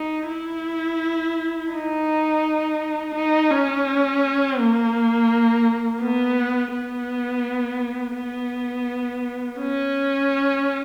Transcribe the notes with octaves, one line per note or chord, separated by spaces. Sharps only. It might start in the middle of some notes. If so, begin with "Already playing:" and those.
Already playing: D#4
E4
D#4
D#4
C#4
A#3
B3
B3
B3
C#4